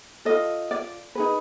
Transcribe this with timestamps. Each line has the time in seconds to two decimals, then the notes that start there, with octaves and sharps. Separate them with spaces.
0.25 F4 A4 D#5
0.71 D5
1.15 D#4 G#4 B4